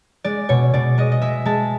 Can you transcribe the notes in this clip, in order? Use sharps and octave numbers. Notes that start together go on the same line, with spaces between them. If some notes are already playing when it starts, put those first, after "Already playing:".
G#3 D5
B2 C#5
B2 D5
G#3 D#5
D#5
G#3 E5
G#3 A5